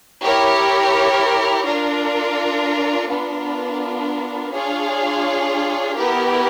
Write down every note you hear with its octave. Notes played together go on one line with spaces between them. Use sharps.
E4 G4 A#4 C#5
D4 F4 A#4
B3 D4 F4 A#4
D4 F4 G#4 C#5 F5
B3 E4 G4 A#4